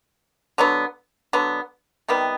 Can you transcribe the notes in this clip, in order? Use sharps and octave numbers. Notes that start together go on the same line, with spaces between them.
D3 F#3 B3
D3 F#3 B3
C3 D#3 G3 B3